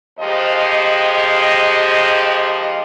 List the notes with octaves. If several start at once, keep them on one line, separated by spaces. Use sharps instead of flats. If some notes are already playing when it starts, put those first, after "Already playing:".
D#2 F3 G#3 G4 C5 D#5